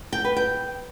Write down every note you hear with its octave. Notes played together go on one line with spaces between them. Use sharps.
G5
B4
G5